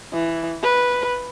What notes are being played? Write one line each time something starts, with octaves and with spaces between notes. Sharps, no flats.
E3
B4